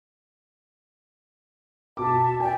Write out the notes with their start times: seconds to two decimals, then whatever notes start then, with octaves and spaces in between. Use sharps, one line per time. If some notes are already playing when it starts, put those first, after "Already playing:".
1.97 B2 E5 A5 D6
2.40 D5 E5 G5 G#5